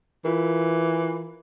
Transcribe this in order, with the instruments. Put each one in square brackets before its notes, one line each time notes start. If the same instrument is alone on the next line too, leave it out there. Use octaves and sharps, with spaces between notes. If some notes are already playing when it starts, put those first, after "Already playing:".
[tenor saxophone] E3 [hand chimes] F4 A#4